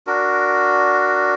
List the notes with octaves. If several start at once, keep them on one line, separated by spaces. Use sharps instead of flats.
D4 F#4 A#4